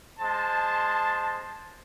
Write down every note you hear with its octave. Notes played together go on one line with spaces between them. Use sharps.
G#3 C5 A5